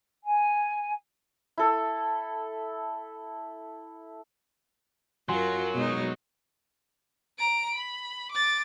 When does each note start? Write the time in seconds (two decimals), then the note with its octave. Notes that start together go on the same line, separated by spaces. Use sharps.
0.24 G#5
1.58 E4 A4
5.29 F#2 F#3 F4 F#4 A#4 G#5 C6
5.74 B2 G#3 D#4
7.38 A#5 D7
7.74 B5
8.31 D6 A6